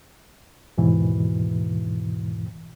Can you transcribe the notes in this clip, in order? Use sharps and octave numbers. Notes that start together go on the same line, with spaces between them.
D#2 G#2 B2 E3